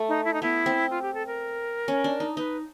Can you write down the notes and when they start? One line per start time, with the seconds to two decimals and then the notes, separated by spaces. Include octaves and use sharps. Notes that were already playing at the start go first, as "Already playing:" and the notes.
Already playing: A3
0.09 D#4
0.25 E4
0.34 D#4
0.42 B3 E4
0.66 C4
0.91 F4
1.02 G4
1.14 A4
1.27 A#4
1.88 C#4
2.04 D4
2.20 D#4
2.37 D#4 B4